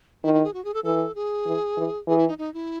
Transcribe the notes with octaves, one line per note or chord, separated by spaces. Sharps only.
D#3 E4
E4
G#4
F#4
G#4
A4
E3 A4
G#4
E3
E3
E3 G#4
E4
D#4
D#4
E4